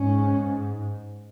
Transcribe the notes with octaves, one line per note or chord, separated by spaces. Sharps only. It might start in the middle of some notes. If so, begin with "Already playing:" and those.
Already playing: G#2 C#4